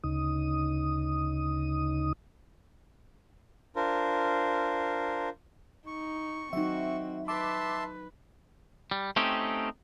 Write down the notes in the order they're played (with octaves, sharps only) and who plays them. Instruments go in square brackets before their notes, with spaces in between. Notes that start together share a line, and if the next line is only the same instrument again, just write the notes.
[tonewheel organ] D2 C#3 D#4 D#6
[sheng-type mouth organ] D4 F4 A#4 C5
[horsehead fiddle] D#4 [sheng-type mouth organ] C#6
[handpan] F#3 D#4 [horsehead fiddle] C4 F#4 [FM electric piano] E5
[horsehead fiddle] B4 [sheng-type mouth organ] E5 A5 C6 [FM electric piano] D6
[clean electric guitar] G3
A3 C4 C#4 D#4 G4